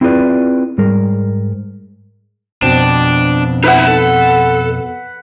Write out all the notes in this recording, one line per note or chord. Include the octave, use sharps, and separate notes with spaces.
C4 E4 F4 G#4 B4 D5
G#2 G3 G#4 A#4
F2 B2 C4 D4
D#4 E4 B4 E5 F#5
A4